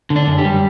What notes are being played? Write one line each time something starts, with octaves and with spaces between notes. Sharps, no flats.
D3
D4
F#2
G4
G3